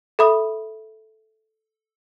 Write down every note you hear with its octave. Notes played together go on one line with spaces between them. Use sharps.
A4 E5 B5 D#6